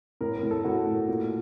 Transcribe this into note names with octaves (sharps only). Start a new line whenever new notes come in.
A2 A#4
A#4
A2
A4
A2 F#4
A2
A#2